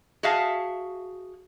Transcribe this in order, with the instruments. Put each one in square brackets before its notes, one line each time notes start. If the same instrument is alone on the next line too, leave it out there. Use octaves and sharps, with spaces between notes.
[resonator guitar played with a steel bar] F#4 G#4 E5 F5 A5